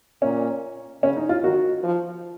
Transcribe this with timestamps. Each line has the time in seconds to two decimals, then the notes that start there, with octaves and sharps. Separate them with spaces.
0.22 A#2 C#4
1.03 C#3 C#4
1.16 D#4
1.29 F4
1.43 D#3 F#4
1.84 F3